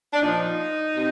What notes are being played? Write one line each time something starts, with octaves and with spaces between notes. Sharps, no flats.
D4
A#2 F3 D#4
C3